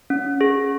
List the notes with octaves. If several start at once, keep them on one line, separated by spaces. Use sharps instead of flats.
C#4
G#4